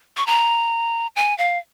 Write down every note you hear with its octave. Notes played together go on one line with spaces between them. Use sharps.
C#6
A#5
G#5
F5